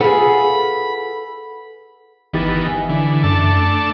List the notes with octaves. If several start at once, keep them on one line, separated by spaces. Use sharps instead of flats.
F4 G#4 A4 B4 F#5 B5
G1 D#3 E3 B3 G4 A6
G#5
D3 E3
F#2 A3 D4 A5